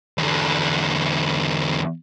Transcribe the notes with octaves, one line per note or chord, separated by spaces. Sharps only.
E2 D3